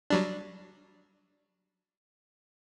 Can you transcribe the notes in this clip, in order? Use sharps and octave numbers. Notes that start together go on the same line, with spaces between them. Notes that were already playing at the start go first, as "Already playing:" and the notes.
F#3 G3 D4